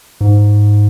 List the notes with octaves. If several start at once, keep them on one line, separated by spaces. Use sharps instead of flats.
G#2